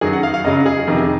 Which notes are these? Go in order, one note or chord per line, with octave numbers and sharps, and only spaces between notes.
F#2 D#3 F#3 G#4
F#5
F5
F5
F#2 C#3 F#3 D#5
G#4
F2 C3 D#3